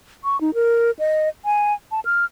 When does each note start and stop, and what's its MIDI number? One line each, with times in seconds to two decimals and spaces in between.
0.24 0.39 85
0.41 0.51 63
0.54 0.91 70
0.99 1.29 75
1.45 1.74 80
1.92 2.00 81
2.05 2.25 89